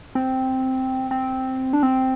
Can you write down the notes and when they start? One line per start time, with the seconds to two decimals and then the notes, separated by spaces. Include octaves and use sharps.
0.15 C4
1.11 C4
1.73 D4
1.83 C4